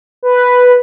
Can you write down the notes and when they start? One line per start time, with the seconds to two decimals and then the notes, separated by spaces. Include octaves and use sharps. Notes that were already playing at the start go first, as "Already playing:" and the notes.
0.23 B4